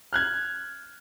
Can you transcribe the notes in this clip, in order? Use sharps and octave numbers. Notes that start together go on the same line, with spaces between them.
F6 F#6 G#6